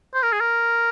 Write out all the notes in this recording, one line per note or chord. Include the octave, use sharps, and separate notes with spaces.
C5
A#4
G#4
A#4